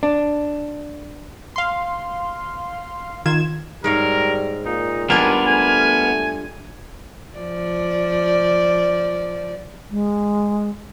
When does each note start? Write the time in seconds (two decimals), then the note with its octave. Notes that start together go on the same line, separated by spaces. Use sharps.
0.03 D4
1.56 F5 C6
3.26 D#3 F4 G#6 E7
3.84 G#2 G3 A#4 C#5 F5
4.66 A#2 D#4
5.10 D#2 G3 B3 D4 F4 A#4 G#5
5.47 A3 G#5
7.37 F3 D5
9.91 G#3